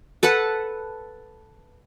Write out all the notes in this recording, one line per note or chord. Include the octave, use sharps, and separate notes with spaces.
A4 B4 F#5 A5